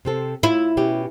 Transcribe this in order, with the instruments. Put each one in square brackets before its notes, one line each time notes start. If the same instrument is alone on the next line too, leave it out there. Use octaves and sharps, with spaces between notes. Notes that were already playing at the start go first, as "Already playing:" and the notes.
[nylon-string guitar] C3 C4 A4
[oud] E4 [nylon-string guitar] F4
[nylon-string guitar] B2 C#4 G4